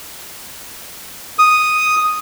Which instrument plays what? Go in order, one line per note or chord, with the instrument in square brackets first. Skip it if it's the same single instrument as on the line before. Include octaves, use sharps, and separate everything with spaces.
[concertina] D#6